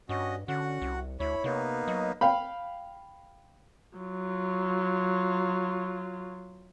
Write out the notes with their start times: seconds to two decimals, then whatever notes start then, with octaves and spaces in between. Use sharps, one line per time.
0.09 G2 C#4 F#4 D#5
0.48 D3 C#4 F#4 F#5
0.82 C2
1.20 D2 E4 C#5 B5
1.44 C3 A#3 B3 D#4
1.88 F#3 D#5
2.21 F5 G5 B5
3.98 F#3 F4